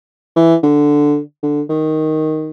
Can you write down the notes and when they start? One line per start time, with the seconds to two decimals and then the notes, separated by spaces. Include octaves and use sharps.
0.36 E3
0.63 D3
1.43 D3
1.69 D#3